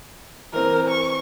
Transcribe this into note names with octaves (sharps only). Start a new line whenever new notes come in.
E3 C4 A#4
C#6